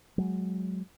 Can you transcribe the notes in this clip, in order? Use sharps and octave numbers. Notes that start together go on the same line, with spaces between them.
F#3 G#3